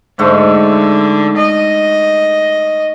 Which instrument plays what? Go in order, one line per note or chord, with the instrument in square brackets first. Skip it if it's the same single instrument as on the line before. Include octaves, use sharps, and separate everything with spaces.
[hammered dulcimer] G#2 A3 [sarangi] D3
[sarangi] D#5